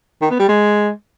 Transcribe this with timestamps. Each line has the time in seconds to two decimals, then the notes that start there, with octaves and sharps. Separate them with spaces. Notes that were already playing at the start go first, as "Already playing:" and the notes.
0.22 D#3
0.31 B3
0.39 G3
0.48 G#3